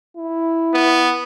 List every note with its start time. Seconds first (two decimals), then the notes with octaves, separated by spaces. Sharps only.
0.17 E4
0.74 B3